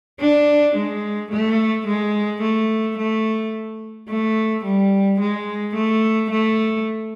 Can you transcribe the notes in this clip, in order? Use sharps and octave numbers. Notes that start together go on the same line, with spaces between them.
D4
G#3
A3
G#3
A3
A3
A3
G3
G#3
A3
A3